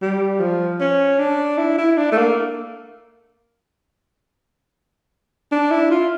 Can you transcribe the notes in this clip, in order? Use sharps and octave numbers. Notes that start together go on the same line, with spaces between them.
G3
F3
C#4
D4
E4
E4
D4
A3
A#3
D4
E4
F4